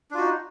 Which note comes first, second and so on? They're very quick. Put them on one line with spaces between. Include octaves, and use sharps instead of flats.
D4 F4 F#4 D#4